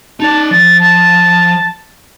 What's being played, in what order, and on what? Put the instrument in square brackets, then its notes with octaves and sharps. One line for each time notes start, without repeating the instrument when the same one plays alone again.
[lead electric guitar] D#4 D5 [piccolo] A5
[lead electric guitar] F3 [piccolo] A6
[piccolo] A5